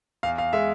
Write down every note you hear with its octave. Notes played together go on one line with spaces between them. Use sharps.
E2 F5
F5
G#3 E5